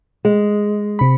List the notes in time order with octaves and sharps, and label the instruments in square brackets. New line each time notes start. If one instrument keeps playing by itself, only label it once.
[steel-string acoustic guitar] G#3
[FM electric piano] C3 B5